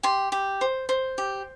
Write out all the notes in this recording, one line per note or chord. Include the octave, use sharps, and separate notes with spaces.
G4 C6
G4
C5
C5
G4